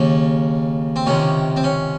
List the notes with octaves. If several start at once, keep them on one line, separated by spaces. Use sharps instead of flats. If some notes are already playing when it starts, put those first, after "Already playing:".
Already playing: D#2 C#3
C4
C#2 C3 D#3 C#4
C4
C#4